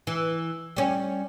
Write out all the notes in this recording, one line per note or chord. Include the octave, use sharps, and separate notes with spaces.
E3
G3 C#4